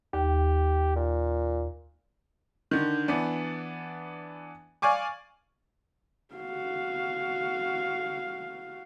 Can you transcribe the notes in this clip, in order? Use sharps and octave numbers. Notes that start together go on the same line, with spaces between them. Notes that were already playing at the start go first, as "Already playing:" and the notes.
D#2 G4
A#2
D3 D#3
E3 B3 D4
D5 F5 G#5 C#6 D6
F#4 F5